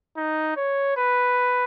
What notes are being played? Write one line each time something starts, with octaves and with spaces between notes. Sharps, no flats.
D#4
C#5
B4